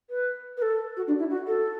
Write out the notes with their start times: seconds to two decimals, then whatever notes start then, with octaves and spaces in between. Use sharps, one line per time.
0.10 B4
0.57 B4
0.62 A4
0.97 F#4
1.07 D4
1.19 E4
1.30 F#4
1.47 A4